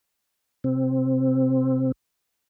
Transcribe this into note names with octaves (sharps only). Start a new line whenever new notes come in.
C3 C4